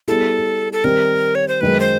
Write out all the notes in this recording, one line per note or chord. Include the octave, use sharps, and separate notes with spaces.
G3 B3 E4 G#4 A4
A4
D#3 G3 C4 A#4
C#5
C5
F#2 D#3 G#3 B4
C5